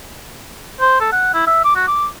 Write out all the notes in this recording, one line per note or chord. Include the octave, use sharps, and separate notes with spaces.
C5
A4
F#5
E4
E5
D6
F#4
D6